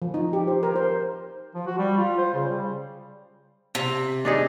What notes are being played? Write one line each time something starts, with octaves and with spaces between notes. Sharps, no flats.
F3
D#4
G4
C5
A#4
C5
F3
F#4
G3
F4
C5
C#3
G3
C3
D4 D#4 G#4